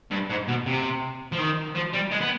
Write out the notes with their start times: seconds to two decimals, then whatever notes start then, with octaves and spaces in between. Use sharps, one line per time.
0.11 G2
0.30 G#2
0.48 B2
0.66 C3
1.32 F3
1.38 D#3
1.75 F3
1.94 G3
2.12 G#3
2.21 B3